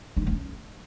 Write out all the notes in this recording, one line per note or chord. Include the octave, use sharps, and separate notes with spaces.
D4
E3
B3
C#4